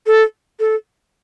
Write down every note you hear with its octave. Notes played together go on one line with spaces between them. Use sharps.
A4
A4